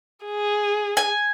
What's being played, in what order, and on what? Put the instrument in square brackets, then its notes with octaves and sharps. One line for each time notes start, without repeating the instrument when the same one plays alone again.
[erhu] G#4
[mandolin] G#5